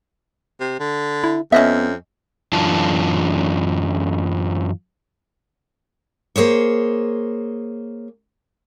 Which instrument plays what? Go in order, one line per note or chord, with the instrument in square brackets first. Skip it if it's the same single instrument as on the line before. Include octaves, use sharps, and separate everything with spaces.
[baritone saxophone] C3
D3
[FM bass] E4
[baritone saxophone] F2 [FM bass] B3 [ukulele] C#4 D#5 E5
[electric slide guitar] F#2 E3 D4 F4 A5
[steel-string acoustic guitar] A#3 G#4 C5 C#5